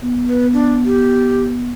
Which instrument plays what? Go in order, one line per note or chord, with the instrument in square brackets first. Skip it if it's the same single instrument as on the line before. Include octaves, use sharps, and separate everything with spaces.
[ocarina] B3
[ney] B4
D4
G4